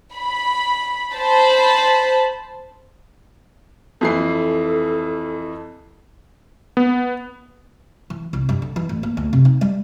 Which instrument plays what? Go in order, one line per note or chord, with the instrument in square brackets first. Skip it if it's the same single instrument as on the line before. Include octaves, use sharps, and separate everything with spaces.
[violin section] B5
C5 A5 B5
[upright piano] F2 E3 C7 [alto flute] A4
[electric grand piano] B3
[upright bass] E3
C2
G2
D3
E3
A1
A#3
D2
C3
D#4
G3